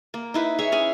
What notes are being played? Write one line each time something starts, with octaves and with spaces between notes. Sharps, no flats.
A#3
D#4 E4 B4
G#4 C#5 E5
C#4 G#4 G#5 B5